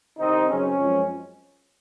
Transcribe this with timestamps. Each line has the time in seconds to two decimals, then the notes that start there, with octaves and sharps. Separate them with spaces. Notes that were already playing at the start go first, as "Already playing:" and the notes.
0.18 C2 C3 D#3 C4 D#4
0.49 F#2 C#3 F#3 C4 C#4
0.78 F#2 F3 G#3 C4